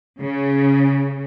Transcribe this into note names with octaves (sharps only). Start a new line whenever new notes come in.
C#3